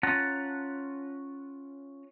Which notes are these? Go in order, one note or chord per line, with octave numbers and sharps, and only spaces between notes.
C#4 F4 F#5 A5 A#5